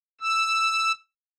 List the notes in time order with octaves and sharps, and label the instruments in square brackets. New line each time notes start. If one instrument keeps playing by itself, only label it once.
[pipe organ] E6